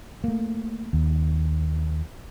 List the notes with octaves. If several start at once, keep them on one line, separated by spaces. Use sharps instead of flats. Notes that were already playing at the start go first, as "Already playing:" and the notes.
A3 A#3
D#2